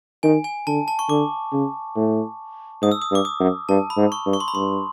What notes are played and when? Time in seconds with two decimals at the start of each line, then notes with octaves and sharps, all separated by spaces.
0.23 D#3 G#5
0.44 G#5
0.67 D3 A5
0.88 A5
0.99 C#6
1.09 D3 D6
1.52 C#3
1.96 A2
2.82 G#2 D#6
2.92 E6
3.02 D#6
3.11 G2
3.15 D6
3.25 D#6
3.40 F#2
3.69 G2 A5
3.90 B5
3.97 G#2
4.12 C#6
4.26 G2
4.33 C#6
4.40 C6
4.48 B5
4.55 G2 C6